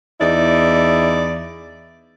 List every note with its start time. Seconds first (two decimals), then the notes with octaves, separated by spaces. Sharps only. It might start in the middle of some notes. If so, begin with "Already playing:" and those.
0.20 E2 D#4 E4 D5